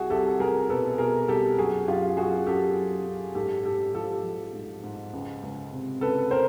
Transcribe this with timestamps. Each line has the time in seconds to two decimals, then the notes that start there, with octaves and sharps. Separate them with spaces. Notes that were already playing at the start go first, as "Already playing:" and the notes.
Already playing: C2 F#4 G#4
0.10 C2 G4 A4
0.40 C2 G#4 A#4
0.69 B2 A4 B4
0.98 B2 G#4 A#4
1.28 C2 G4 A4
1.57 F#2 F#4 G#4
1.87 F#2 F4 G4
2.17 F#2 F#4 G#4
2.47 F#2 G4 A4
2.77 F#3
3.06 F#2
3.35 G#2 G4 A4
3.65 G#2 G4 A4
3.94 F3 G4 A4
4.24 F3
4.53 G#2
4.84 G#2
5.14 C#2
5.43 C#2
5.73 C3
6.01 C#2 A4 B4
6.31 A#4 C5